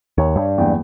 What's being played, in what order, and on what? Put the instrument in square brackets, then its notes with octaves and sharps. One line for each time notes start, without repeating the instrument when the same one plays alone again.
[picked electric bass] D#2 [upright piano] C#5
[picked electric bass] G2
[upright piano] F#1 E2 G5